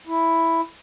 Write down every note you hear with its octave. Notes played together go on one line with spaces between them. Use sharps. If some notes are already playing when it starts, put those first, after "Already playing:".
E4